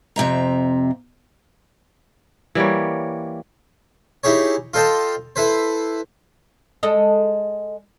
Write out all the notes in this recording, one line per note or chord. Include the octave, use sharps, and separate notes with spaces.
F2 C3 E5 A#5
E3 G3 A#3 C#5
D#4 E4 G4 G#4 C#5
F4 A4 C5 D#5 G5 A5
E4 A4 B4 C5
G#3 A4 D#5